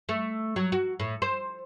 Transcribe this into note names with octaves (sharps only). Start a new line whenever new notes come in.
A3
F#3
F#4
A2
C5